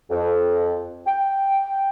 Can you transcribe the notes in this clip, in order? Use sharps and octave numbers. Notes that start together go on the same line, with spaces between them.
F2
G5